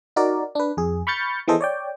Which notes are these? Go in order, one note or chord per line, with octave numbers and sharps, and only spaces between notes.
D#4 F#4 A#4 D5
D4 B4
F2 G#4
B5 C#6 F6 G6 A6 C#7
E3 B3 G#4 A4 C5 D#5
C#5 D5 G5